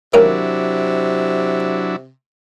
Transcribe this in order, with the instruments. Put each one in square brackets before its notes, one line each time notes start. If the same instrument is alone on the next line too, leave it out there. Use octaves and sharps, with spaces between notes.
[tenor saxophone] C3 [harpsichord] D#3 A#3 C#4 [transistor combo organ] F#3 D4 E4